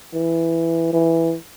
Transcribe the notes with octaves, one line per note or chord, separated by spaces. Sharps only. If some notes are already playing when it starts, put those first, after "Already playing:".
E3
E3